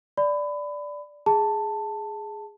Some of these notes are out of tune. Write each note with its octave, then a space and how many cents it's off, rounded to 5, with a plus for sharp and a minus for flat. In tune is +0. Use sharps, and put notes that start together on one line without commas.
D5 -5 B5 +25
G#4 +0 A5 +10